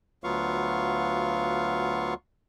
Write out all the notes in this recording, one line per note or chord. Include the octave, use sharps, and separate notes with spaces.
D2 F#3 B3 F4 F5 C#6